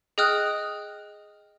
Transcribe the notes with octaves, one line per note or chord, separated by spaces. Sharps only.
G#4 D#5 G5 D#6 F6 F#6